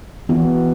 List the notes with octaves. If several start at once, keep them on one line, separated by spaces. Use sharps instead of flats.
E3 B3 F#4